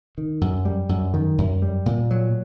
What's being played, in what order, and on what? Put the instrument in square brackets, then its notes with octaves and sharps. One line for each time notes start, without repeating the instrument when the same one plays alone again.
[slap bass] D#3
F#2
G3
F#2
D#3
F#2
G3
A#2
F#3